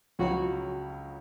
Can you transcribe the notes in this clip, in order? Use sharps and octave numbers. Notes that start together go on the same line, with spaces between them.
C#2 C#3 F#3 F#4